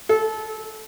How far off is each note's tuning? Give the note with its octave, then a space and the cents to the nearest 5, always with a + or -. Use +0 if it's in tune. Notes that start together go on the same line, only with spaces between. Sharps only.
A4 -25